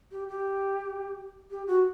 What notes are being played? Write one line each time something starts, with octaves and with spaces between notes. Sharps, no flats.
G4
G4
G4
F#4